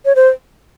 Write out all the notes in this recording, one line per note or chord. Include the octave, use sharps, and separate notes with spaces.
C#5
C5